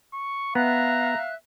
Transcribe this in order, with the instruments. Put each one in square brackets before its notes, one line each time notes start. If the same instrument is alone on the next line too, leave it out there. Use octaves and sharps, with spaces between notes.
[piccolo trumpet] C#6
[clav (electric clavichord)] B3 [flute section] E5 F5 F#6 [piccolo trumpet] A#5